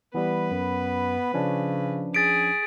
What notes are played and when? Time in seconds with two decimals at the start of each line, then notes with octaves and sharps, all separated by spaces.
0.14 E3 G3 B3 B4
0.51 F#2
1.34 C#3 F3 C#4 D4
2.14 G#4 A6 B6 D7